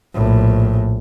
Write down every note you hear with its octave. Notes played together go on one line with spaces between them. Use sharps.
A#1 A2